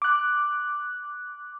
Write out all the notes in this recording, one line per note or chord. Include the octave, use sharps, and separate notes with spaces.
D6 F#6